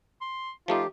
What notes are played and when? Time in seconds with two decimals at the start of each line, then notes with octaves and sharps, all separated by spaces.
0.21 C6
0.68 F3 A3 D#4 F4 G4